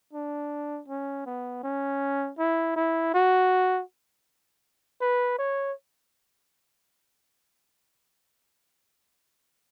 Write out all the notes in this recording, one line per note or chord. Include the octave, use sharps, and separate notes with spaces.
D4
C#4
B3
C#4
E4
E4
F#4
B4
C#5